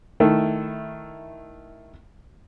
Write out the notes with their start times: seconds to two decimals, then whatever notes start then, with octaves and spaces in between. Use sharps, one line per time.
0.20 D#3 A3 E4